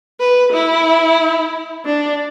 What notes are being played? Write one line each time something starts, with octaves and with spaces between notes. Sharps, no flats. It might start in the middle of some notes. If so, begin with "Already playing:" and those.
B4
E4
D4